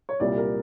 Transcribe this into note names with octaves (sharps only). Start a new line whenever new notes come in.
C#5
C2 A#2 G3 D5
A#4